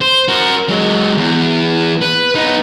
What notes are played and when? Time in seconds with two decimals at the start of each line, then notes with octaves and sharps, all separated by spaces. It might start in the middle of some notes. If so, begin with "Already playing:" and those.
0.01 C5
0.28 F#4 A#4
0.69 F#3 G#3
1.17 E2
2.01 B4
2.35 B3 D#4